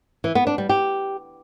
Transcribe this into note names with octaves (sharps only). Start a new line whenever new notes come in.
E3
B3
D4
G3
G4